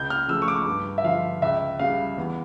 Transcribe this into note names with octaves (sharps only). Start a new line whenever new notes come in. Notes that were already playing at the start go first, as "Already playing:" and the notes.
Already playing: C#2 G6
F6
C#3 F3 A3 E6
C#6
D6
G2
E5
D3 F3 F5
C#2 E5
C#3 G3 F5
E2